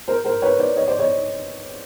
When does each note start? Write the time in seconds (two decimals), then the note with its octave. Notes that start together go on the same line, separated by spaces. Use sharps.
0.08 A#4 C5
0.25 A#4 C5
0.42 B4 C#5
0.59 C5 D5
0.76 C#5 D#5
0.88 C5 D5
0.99 C#5 D#5